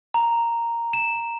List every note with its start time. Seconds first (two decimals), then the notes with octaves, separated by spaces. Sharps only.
0.14 A#5
0.93 E7